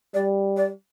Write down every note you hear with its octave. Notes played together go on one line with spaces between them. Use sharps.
G3 D5
D5